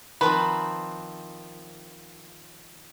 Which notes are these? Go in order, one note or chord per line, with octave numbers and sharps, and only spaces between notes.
D#3 F3 C4 B4